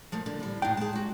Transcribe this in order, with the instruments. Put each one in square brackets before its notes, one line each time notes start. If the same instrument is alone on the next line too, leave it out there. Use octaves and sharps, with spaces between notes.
[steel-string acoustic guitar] F3 A3 A#3
D3
A2 G3
[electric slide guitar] A2 G5 [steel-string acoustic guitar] D4 D#4
[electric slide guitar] G#3 [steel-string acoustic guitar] G#4 A5
[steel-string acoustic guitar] F#4 G4